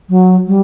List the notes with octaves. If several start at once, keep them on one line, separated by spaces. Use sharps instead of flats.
F#3
G3